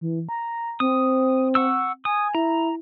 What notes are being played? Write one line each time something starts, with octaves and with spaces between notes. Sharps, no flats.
E3
A#5
C4 D#6
F#5 C#6 E6
G#5 D#6
E4 A#5